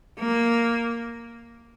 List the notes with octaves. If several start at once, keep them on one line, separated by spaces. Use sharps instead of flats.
A#3